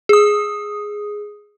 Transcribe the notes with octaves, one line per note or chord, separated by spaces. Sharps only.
G#4 D#6